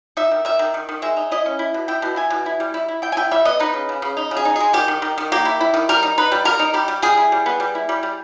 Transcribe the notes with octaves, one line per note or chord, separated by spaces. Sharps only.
D#4 E5
D#3
D#3 E5
D#3
D#3
D#3
G#3 E5
D#4
E4 D#5
C#4
E4
B2
E4 G5
B2
E4 G#5
B2
E4
G3
E4
E4
E4 G5
G#5
E4 G5
G3 E5
B3 D#5
D#4 B4
C#3
C#3
C#3
D#4
C#3
G#4
D#4
G#3 G#4
D#3 G4
D#3
D#3
D#3
A#3 G4
E4
E4
D#3
G3 A#4
D#4
D#4 B4
G3
G3 A#4
D#4
G3 G4
G3
G3 G#4
E4
G3
B3
G3
E4
G3
G3